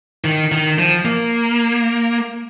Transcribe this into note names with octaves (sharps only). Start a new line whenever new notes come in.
D#3
D#3
F3
A#3